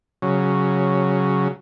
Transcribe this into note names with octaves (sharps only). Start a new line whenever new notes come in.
C#3 F#3